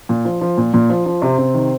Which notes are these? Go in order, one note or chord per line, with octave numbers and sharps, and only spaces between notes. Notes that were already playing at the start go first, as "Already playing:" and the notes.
A#2
F3
F3
A#2
A#2
F3
F3
C3 C4
C3
D#3